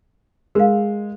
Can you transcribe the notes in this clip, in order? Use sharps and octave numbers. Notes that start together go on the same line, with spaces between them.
G#3 A#4 F5